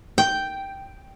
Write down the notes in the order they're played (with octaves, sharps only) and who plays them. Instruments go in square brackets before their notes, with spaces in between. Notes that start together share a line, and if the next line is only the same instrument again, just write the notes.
[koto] G5